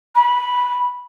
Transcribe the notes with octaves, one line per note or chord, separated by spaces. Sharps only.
B5